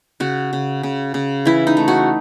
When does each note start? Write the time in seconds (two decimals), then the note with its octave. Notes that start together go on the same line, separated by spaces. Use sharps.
0.20 C#3 F#4
0.53 C#3
0.83 C#3
1.14 C#3
1.45 E3 E4
1.67 D#4
1.77 A3
1.88 F#4